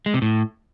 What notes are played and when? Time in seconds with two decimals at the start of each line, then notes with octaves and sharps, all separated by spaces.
0.06 G#3
0.14 C3
0.22 A2